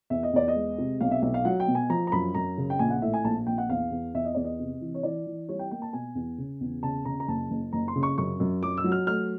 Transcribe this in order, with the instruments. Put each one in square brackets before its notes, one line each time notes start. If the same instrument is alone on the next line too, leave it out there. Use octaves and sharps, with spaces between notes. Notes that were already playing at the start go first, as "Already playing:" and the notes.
[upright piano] E2 E5
D#5
E2 D5
D#5
G#3
C3
B1 F5
E5
B1 E5
F5
F#3 F#5
G5
B2
G#5
F3 A#5
A#5
F#2 B5
F#2 A#5
C#3
G5
A#1 G#5
F#5
A2 E5
G#5
A#1 A5
A#1 G5
F#5
E2 F5
E2
E2 E5
D#5
E2 D5
D#5
C3
E3
C#5
E3 D5
E3
G3 C#5
G5
A#3 G5
A5
B2 G#5
E2
C#3
E2
C#3 A5
C#3 A#5
A#5
F#1 A5
F#1
F#1 A#5
C6
C#3
C#6
F#2 C#6
F#2
F#3 D6
E6
F#3
F6
A3 F6